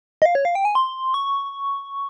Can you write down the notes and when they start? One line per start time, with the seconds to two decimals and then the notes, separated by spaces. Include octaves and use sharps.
0.22 D#5
0.25 F5
0.35 C#5
0.45 F5
0.55 G5
0.65 G#5
0.75 C6
1.14 C#6